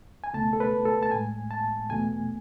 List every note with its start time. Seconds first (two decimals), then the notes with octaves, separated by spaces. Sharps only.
0.24 G#5
0.34 C#2 B2 A3 A5
0.53 A4
0.60 B4
0.85 A4
1.03 A5
1.11 A2 G#3 G#5
1.51 A5
1.89 E2 B2 A3 G#5